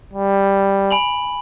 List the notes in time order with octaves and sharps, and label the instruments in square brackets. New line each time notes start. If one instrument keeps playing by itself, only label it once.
[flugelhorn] G3
[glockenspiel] G#5 B5 F#7